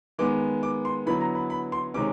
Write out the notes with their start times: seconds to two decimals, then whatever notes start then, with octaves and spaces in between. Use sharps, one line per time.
0.18 D#3 G#3 B3 D6
0.63 D6
0.85 C6
1.06 D3 F#3 B3 E4 B5
1.21 A#5
1.35 B5
1.50 B5
1.72 C6
1.94 C3 D#3 G#3 C#4 D6